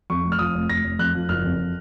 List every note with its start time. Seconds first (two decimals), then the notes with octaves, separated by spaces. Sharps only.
0.10 F2 C#6
0.25 F1
0.32 F6
0.39 F3 D#6
0.55 F1
0.69 F1 A#6
0.84 F1
0.99 F2 F#6
1.15 F3
1.29 F#1 F6
1.44 F2